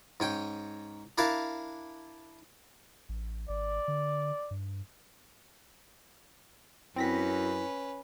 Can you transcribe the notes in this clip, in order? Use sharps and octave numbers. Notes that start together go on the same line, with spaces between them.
G#2 C#4 G5
D4 E4 A#4 F5 A5
A1
G#1 D5
D3
G2
F#2 C4 C#4 E4 B4 A#6 B6